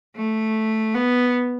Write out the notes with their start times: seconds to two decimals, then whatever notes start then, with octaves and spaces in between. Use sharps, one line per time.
0.16 A3
0.94 B3